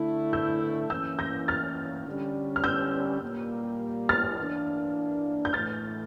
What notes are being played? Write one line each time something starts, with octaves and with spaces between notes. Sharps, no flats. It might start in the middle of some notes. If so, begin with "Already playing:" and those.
Already playing: D3 A3 E4
E6 G6
E3 A#3 C#4 E4 E6 G6
G6 A#6
F6 A6
D3 G3 C#4
F6
E6 G6
A#2 G3 A#3
F6 A6
E3 A#3 D4
G6
A2 E3 A3 F6 A6